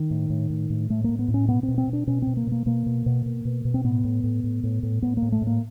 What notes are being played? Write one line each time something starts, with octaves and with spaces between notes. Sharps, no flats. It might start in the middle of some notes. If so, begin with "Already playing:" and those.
Already playing: D#3
A2
A2
A2
A2
A2 A3
A2 A#3
B3
A2
C#4
B2 B3
C4
B2
C4
B2
D4
B2 C#4
B2 C4
A#3
B2 A#3
B2 A#3
B2
B2
B2
B2
B2
C4
A2 B3
A2
A2
A2
A2
A2
A2 B3
A#3
A2
A3
A2
A#3